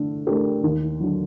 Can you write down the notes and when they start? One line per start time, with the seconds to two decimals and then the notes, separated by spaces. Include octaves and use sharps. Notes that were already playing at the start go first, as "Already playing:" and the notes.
Already playing: D3 A3 D4
0.27 A3 D4 G4 A#4
0.63 D#2
1.00 D3 F#3